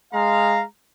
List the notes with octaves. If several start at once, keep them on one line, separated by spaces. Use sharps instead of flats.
G#3 F5 A#5